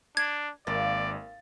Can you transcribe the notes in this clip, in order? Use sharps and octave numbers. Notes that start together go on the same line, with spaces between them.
D4 G#6
G#1 A#3 D5 A6